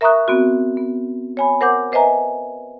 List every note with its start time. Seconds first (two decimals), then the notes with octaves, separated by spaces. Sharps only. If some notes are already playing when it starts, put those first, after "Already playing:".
0.01 A#4 E5 A#5 C#6 D#6 F#6
0.28 B3 C4 F#4
0.77 B3
1.37 C#5 G#5 B5
1.61 A#4 C5 F#5 D6 G6
1.92 B4 C5 D#5 E5 G#5 A#5